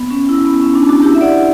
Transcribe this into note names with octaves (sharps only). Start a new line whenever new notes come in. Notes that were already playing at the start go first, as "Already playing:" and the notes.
Already playing: B3
C#4
E4
B3
C#4
D4
D4 F#4
E4 G4
E5
D5 F#5